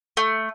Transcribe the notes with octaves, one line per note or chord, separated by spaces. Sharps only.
A3